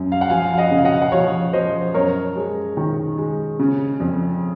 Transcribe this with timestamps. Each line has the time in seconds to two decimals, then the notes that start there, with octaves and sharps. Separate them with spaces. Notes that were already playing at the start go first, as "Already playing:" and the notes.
Already playing: F#2
0.12 F5
0.21 F#5
0.30 F3 F5 G#5
0.54 F5
0.58 D#5 F#5
0.71 C#3
0.78 F5
0.85 D#5 F#5
1.02 F#5
1.12 F3 C#5 F5
1.53 F3 C5 D#5
1.94 F#2 A#4 C#5
2.36 G#3
2.77 D#3
3.17 G#3
3.59 C#3
4.00 F2